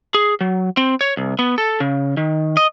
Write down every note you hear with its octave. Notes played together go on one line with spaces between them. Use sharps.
G#4
F#3
C4
C#5
C2
B3
A4
C#3
D#3
D#5